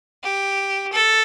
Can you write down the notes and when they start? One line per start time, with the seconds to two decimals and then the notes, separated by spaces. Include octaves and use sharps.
0.23 G4
0.93 A4